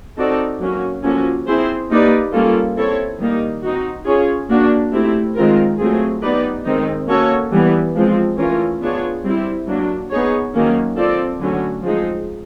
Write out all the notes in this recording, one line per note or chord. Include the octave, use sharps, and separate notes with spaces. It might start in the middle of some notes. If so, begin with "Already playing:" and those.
C4 D#4 F#4 A4 D5
F#3 A#3 C#4 F#4
F3 A#3 C#4 F#4 A4
C4 E4 G#4 C5
A#3 D#4 G4 B4 D5
G3 A#3 C#4 F4 A4
C4 E4 A4 C#5
D#3 G3 A#3 D#4
C4 D#4 F#4
C#4 F4 G#4 C#5
A#3 D4 F#4
A3 C4 E4 G4
D#3 G#3 C4 F4 A#4
F#3 A3 C4 F4 G#4
B3 D#4 G4 B4 D5
D#3 G#3 C4 D#4
A#3 C#4 F#4 A4 C#5
E3 G3 B3
F3 G#3 C4
E3 A3 C#4 F4 A#4
B3 D4 F4 G#4 C#5
G3 C4 E4 G4
F#3 A#3 D4
B3 D#4 G#4 C#5
D#3 F#3 A#3 C#4
C4 F4 A4 D5
D3 F#3 A3 C#4 F#4
F3 G#3 C4 D#4 G#4